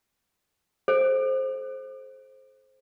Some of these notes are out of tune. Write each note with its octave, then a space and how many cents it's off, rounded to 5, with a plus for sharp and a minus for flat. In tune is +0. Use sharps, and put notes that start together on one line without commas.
A4 -45 C5 +10